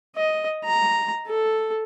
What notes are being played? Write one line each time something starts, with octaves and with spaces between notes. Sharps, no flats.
D#5
A#5
A4